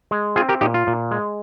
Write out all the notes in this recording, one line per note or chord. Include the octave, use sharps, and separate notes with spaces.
G#3
C4 F4 G#4
G4 A#4
A#2 D#4 G4
F4
A#2
G#3